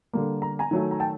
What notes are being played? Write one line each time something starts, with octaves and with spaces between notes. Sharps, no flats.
D3 G3 A#3
A#5
G#5 A#5
D#3 F#3 A3
A#5
G5 A5